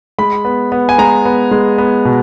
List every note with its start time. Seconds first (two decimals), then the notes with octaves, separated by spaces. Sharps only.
0.18 G#3 B5
0.45 B3
0.72 B3
0.89 G#5
0.98 G#3 A#5
1.25 B3
1.51 G#3
1.78 B3
2.05 B2